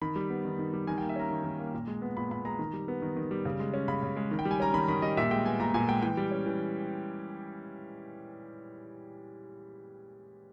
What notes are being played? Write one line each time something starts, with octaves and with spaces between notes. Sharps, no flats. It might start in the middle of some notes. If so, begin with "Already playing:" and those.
D#3 B5
G3
B3
D#3
D#3
G3
D#3 G#5
A#3 G5
E5
C#4 A#5
D#3
D#3
A#3
A#2
G#3
B3
A#2 B5
A#2 B5
G#3 A#5
D#3
G3
B3
D#3
D#3
G3
C#3
G#3
C#4
C#3 B5
C#3
G#3
D#3
G5
G3
G#5
C#4 A#5
D#3 B5
D#3 B5
G3 D#5
A#2 E5
G#3 G5
B3 G#5
A#2 A#5
A#2 G#5
G#3 G5
E3 G5
G3
C#4
E3